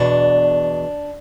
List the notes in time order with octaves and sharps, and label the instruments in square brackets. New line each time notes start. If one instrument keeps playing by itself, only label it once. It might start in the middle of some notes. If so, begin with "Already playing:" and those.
Already playing: [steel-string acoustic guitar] E2 B2 D4